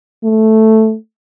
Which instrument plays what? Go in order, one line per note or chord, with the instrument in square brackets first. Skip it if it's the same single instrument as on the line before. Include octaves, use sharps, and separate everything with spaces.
[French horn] A3